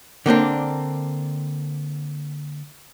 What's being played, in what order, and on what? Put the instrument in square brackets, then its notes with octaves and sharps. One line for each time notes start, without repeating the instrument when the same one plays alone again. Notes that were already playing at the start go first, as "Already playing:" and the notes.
[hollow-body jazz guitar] D3 A#3 C4 D4